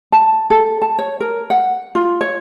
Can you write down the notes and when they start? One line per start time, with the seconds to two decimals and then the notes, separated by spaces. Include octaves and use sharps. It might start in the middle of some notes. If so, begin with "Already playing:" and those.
0.12 A5
0.50 A4
0.82 A5
0.99 C#5
1.20 A#4
1.50 F#5
1.95 F4
2.21 C#5